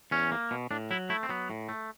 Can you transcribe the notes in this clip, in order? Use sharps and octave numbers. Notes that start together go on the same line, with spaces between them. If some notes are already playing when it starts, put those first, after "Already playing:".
E2 C#4
A#3
B2
A2 D4
F#3 E4
A3 E4
C4
F#3 B3
A2
A3